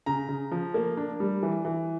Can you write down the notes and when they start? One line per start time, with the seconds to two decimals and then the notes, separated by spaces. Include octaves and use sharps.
0.06 C#3 A#5
0.29 C#3
0.52 F3
0.74 A#3
0.97 D4
1.20 G3
1.43 E3
1.65 E3